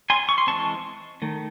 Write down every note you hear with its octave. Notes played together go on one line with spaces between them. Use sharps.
G#5 C6
C#6
C6
E3 G#3 C4 A5 C#6
D#3 A3